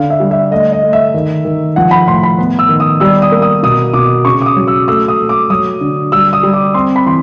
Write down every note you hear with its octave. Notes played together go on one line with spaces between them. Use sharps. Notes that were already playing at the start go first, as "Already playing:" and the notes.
Already playing: D3 F5
E5
G3
E5
A3 D#5
D#5
A3
E5
D#3
D#3
F3 F#5
B5
A2 C6
B5
B3
E6
D#3
D#6
G3 E6
D#6
A#3
D#6
B2 D#6
B2 D6
C#3 C#6
D6
D#6
F#3
E6
A3 E6
D#6
A3
D6
F#3 D#6
D3
G3 E6
D#6
G3
D6
C4 C6
B5
E3 C6